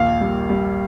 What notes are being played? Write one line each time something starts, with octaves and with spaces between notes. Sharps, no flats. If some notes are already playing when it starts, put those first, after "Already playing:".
Already playing: A#1 D#2 F5
G3
G3